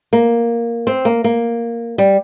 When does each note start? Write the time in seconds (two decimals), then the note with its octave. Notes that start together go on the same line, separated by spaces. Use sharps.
0.13 A#3
0.87 C4
1.05 A#3
1.24 A#3
1.98 G3